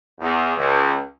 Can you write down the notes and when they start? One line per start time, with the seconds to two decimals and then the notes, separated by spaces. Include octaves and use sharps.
0.20 E2
0.56 C#2